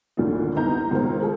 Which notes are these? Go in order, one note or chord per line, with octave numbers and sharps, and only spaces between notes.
D2 A#2 D3 D#3 F#3 D4
C2 B3 D#4 A#5 G6
C#2 B2 D#3 A#4 C5
G#4 A4